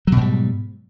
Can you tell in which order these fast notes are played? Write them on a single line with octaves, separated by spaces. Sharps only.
F#3 B2 G#2 G3